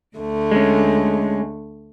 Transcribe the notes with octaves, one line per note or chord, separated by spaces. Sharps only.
D2 D3 A3
G#3 C#4